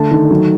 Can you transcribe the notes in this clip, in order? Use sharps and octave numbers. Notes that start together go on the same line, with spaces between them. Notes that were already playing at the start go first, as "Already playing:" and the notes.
Already playing: D3 A3 A5
D#3
F#3